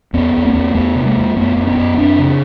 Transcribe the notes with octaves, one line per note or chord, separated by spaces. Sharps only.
E2 B3 C#4
E2
A#3 C4
E2
E2 A3 B3
C3
G#3 A#3
E2
F#2 A3 B3
F#2
B3 C#4
F#2
F#2 C4 D4
C#3